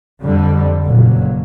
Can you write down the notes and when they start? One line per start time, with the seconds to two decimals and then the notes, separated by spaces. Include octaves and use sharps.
0.22 F2 D3 G3
0.85 F#1 A#2 F#3